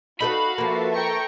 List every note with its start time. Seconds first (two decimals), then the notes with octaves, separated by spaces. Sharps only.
0.20 D#4 F#4 A4 B4 F5 B5
0.58 F3 A#3 A4 B4 E5
0.94 G5 A#5 C#6